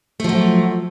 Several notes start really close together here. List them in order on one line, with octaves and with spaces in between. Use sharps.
A3 F3 F#3